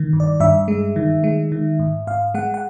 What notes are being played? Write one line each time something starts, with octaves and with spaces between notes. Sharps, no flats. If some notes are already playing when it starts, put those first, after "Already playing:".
Already playing: D#3
G2
D5
G2 E5
G#3
D#3
G#3
D#3
G#2
G#2 F5
G#3 F#5
F#5